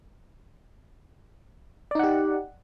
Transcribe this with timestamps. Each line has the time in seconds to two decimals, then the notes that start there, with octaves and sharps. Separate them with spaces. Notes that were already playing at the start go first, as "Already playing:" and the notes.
1.91 D5
1.95 D#4
1.99 F#5
2.03 G4